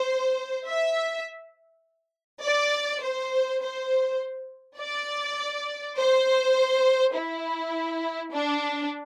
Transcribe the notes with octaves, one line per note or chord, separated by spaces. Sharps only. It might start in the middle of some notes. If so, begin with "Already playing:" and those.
Already playing: C5
E5
D5
C5
C5
D5
C5
E4
D4